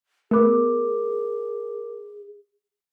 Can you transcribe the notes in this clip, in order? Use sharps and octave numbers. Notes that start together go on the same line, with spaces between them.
A3 B3 G#4 A#4 D6